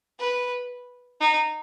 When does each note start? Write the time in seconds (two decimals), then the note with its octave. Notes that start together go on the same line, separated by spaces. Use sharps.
0.19 B4
1.21 D#4